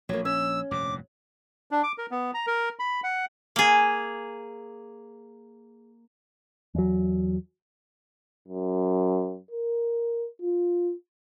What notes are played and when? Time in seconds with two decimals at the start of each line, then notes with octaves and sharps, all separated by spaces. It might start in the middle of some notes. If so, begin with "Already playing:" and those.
0.09 A#1 F#3 A#3
0.25 C#4 E6
0.71 F1 G2 A#2 D6
1.71 D4
1.83 D6
1.98 A#4
2.11 B3
2.34 A#5
2.47 A#4
2.79 B5
3.04 F#5
3.56 A#3 G#4
6.75 E2 F#3
8.48 F#2
9.51 A#4
10.42 F4